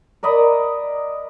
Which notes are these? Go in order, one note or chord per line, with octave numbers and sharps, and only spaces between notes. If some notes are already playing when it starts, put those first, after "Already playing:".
A#4 D5 D#5 B5